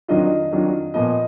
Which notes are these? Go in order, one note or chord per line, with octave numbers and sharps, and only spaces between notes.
F2 D#3 F#3 D4 F4 D#5
F2 D#3 F#3 D4 F4
A#2 F3 B3 F4 D#5